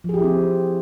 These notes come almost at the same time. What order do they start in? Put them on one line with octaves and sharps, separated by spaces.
F3 G#4 G4 E4 C4